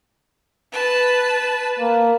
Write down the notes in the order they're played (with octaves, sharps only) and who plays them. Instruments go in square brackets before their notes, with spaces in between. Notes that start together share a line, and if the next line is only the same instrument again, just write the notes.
[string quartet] B4 A5
[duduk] A#3